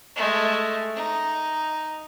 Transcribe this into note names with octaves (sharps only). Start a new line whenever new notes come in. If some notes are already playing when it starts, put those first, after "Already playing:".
G#3 A3
D#4